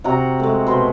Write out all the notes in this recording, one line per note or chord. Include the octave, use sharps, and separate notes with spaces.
C3 F#4 F#5 A#5
G#3 A3
B2 B4 C5